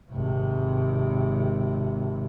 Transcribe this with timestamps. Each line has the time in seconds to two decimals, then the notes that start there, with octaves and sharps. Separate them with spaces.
0.11 G#1 C3